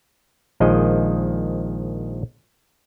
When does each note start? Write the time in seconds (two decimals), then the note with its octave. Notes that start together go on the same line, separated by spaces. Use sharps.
0.60 A#1 D#3 F3 G#3 D#5